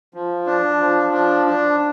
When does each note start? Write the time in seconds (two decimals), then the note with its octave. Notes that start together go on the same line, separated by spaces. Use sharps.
0.14 F3
0.46 D4
0.79 F3
1.13 D4
1.47 D4